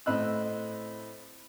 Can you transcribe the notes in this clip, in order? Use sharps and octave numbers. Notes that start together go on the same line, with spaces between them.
A2 C4 D#5 E6 F#6